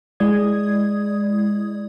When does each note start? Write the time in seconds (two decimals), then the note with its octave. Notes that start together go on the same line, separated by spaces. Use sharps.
0.20 G#3 E4 D5 D#6 G#6